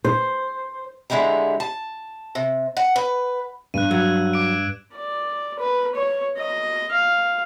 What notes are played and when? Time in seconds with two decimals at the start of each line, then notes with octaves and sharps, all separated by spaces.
0.05 C5
1.10 D3 G#3 E4 G4 A#5
1.60 A5
2.35 C3
2.77 F#5
2.96 B4
3.74 G2 F#6 D#7
3.91 F#3 E6 F#6 G#6
4.33 D6 D7
4.95 D5
5.59 B4
5.95 C#5
6.37 D#5
6.92 F5